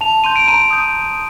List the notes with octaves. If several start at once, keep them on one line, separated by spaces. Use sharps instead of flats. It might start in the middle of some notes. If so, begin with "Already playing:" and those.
A5 F7
C6 G6 D#7
D7
A#5 D#7
D#6 G6